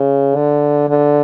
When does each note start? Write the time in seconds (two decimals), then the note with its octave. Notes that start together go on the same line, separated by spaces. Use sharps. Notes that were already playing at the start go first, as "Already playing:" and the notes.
Already playing: C#3
0.36 D3
0.89 D3